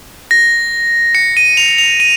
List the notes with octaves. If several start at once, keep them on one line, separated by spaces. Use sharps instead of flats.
A#6
C#7
D#7
F7
F7
D#7